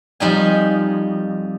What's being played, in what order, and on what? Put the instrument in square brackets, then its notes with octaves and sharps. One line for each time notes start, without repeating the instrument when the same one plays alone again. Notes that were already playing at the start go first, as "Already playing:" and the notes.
[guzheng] F2 G3 D#4 G#5